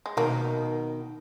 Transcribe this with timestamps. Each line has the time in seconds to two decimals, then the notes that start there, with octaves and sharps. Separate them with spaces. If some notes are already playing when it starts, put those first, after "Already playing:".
0.06 G#3
0.17 B2 D#3 A#3